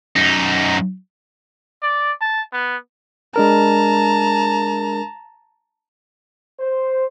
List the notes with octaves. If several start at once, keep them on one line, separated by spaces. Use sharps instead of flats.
F#2 D#4
D5
A5
B3
G#3 D4 A#4 A5 A#5
C5